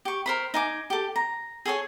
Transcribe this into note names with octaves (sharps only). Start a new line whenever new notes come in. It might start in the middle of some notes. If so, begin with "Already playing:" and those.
G4 C#6
A#4 C5 B5
D#4 G#5 D6
G4 A4
A#5
G#4 A4 C#5 G#5